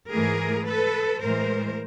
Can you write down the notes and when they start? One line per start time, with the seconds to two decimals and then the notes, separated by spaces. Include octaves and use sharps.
0.10 G#2 E3 A3 G#4 A#4
0.65 A4 B4
1.21 A2 E3 G#3 A#4 C5